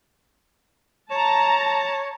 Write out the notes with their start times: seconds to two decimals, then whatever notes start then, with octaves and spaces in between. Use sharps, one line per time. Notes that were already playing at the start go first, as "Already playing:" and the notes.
1.11 C#5 A5 A#5